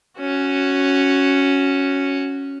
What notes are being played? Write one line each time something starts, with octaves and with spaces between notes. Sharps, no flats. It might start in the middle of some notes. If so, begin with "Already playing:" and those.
C#4 F#4